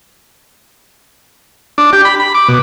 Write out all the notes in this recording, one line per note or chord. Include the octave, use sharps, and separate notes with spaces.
D4
G4
B5
B5
D6
B2